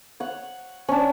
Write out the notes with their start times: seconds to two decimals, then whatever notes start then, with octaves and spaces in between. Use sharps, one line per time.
0.20 C#5 F#5
0.88 C#4 D4